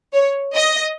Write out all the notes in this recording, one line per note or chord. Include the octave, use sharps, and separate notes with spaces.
C#5
D#5